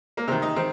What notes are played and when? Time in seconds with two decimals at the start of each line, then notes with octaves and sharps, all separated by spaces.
0.17 A#3
0.28 C3 D#3 C4
0.42 D#4
0.56 D#3 C4